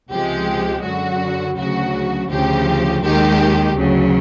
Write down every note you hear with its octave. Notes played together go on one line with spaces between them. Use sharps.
C#2 C3 F3 G#3 G4
F#2 D3 F#3 F#4
D2 C#3 F#3 F#4
D2 C#3 F3 G4
D#2 D#3 G#3 G4
D2 C#3 F#3